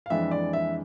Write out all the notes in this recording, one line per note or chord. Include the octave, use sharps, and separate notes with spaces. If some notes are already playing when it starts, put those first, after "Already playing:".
F5
F2 E3 G#3 D4 E5
D5
E5